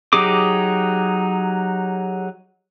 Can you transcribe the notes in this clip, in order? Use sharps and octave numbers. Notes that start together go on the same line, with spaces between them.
F#3 D#4 G4 G#4 D6